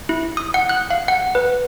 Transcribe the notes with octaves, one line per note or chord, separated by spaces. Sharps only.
E4
D#6
F#5
F#6
F5
F#5
B4